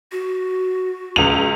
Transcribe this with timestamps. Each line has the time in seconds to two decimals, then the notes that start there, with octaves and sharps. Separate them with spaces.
0.12 F#4
1.16 C#2 F7